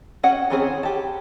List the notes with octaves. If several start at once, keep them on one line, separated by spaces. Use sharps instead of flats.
C#4 F#4 C#5 F#5 G5
D#3 E3 C4 C#4 G#4
G4 A5